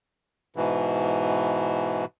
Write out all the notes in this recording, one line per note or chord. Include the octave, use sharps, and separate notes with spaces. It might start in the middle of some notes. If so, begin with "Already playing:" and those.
G#2 B2 E3